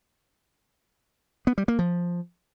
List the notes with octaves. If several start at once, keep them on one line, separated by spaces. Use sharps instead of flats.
B3
G3
A#3
F3